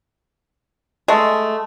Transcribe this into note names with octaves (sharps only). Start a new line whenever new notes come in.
G#3 A3